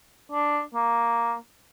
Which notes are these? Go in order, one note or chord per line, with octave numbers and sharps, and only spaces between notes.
D4
A#3